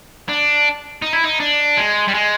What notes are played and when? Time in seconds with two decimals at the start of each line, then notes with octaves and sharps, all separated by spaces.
0.29 D4
1.02 D#4
1.13 E4
1.24 D#4
1.40 D4
1.77 G#3
2.08 G3
2.14 G#3